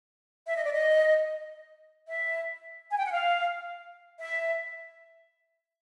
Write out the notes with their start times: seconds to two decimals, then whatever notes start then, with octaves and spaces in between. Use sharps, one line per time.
0.48 E5
0.56 D#5
0.64 D5
0.72 D#5
2.07 E5
2.91 G#5
2.97 G5
3.05 F#5
3.12 F5
4.19 E5